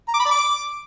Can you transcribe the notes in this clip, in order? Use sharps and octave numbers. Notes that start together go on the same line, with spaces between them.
A#5
D6
B5
D5
D6